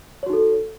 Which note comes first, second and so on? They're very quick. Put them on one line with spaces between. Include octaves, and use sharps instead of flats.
C#5 F#4 D#4 A4